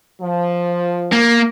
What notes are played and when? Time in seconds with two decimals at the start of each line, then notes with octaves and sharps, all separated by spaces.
0.22 F3
1.12 A#3